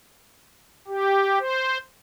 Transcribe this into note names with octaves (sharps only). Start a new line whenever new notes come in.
G4
C5